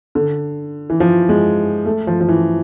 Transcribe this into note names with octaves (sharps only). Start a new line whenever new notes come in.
D3
E3
F3
G#3
A3
F3
F3
E3